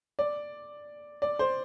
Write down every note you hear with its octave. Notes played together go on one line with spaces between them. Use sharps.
D5
D5
C5